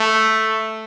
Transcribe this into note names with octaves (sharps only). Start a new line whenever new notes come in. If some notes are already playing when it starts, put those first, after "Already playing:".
Already playing: A3